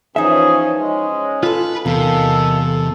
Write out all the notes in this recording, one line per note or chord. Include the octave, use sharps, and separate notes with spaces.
E3 F3 C#4 D#4 G#4 E5
G#3 C#4
F4 A4 B4
E2 C3 D#3 A4 F5